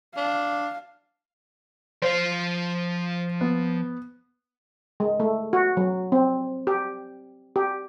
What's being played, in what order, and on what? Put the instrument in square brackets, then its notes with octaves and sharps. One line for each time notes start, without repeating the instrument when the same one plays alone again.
[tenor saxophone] D4 [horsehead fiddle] F5
[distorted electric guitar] F3 F5 [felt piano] C5
[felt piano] B3
[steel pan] G#3
A3
F#4
F#3
C4
G4
G4